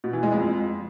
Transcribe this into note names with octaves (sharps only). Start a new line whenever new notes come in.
B2
E3
G#3
F2